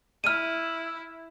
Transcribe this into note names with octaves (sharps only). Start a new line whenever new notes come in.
E4 F6 D#7